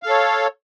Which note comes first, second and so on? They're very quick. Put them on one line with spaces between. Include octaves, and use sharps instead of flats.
F5 A4 C#5